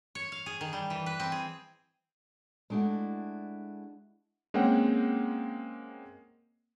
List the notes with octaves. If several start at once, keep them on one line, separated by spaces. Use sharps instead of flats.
C#5
F5
G#4
D#3
G3
E3
B4
C4
G#4
G#3 A3 D4 E4 F#4
G#3 A#3 C4 C#4 F#5 G5